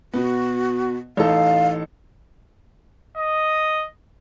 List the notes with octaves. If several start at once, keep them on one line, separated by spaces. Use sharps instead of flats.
B2 B3 F#4
A1 D#4 A4 F5
D#5